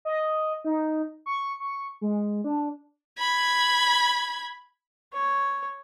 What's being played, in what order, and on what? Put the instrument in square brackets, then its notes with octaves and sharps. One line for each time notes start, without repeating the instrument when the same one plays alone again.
[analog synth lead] D#5
D#4
C#6
C#6
G#3
D4
[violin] B5 G#6
[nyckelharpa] C#5